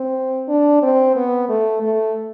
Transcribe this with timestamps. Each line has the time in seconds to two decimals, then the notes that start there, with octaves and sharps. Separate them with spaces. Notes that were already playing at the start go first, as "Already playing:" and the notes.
Already playing: C4
0.48 D4
0.82 C4
1.16 B3
1.49 A3
1.82 A3